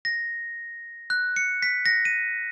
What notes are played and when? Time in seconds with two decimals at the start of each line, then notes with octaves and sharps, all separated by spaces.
0.05 A#6
1.10 F#6
1.36 C#7
1.62 B6
1.86 A#6
2.05 D#7